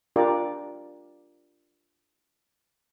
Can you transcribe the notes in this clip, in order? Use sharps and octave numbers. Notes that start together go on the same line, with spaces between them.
D4 F4 G4 A#4 D5